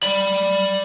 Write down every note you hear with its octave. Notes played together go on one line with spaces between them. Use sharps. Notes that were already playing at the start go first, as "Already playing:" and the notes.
D5 B5